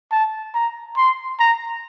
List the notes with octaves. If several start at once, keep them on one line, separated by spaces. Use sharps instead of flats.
A5
A#5
C6
A#5